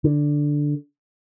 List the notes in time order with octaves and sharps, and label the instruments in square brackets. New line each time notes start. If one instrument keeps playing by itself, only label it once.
[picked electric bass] D3